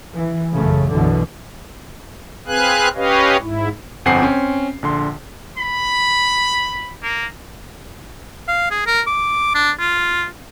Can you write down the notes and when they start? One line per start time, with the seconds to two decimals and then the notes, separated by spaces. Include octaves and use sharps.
0.14 E3
0.54 A1 F#2 C#3 A3
0.91 B1 F#2 B2 D3 E3
2.46 C4 G#4 B4 F5 G#5 F#6
2.95 C#4 G4 B4 C#5 D#5 F5
3.41 G#2 E4
4.05 G1 F2 C4 F#5 G#5 C7
4.22 C4 C#4
4.82 A#1 D3 C6
5.58 B5
7.02 A#3
8.48 F5
8.70 G#4
8.86 A#4
9.06 D6
9.54 D4
9.79 F4